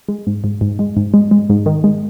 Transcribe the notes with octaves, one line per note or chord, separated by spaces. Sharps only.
G#3
G#2
G#2
G#2
G#3
G#2
G#3
G#3
G#2
D#3
G#3